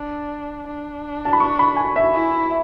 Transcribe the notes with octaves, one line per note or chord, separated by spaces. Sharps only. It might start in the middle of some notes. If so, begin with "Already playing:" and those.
Already playing: D4
D4
A5
B5
C#6
B5
G#5
E5
E4